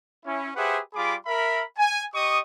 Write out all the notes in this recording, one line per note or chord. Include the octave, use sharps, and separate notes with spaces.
C#4 E4
G4 G#4 B4 C5 E5 F#5
G3 F4 G#4 B5 D6
A#4 E5 B5
G#5
G4 D#5 C#6 D#6